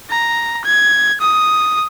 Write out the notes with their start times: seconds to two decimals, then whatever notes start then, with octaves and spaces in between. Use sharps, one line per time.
0.10 A#5
0.65 G#6
1.21 D#6